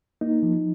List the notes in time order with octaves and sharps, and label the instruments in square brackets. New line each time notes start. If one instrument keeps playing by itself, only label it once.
[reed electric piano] A#3 D#4
F3